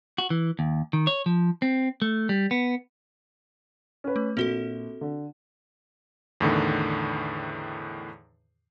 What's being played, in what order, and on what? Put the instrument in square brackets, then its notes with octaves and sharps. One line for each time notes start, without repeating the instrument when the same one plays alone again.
[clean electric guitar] F#4
E3
D#2
D#3
C#5
F3
C4
A3
G3
B3
[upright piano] C#4 B4
[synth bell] A3
[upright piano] A#1 G7 [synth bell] C4 F#4 A4
[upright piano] D3
[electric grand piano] E2 A2 D3 D#3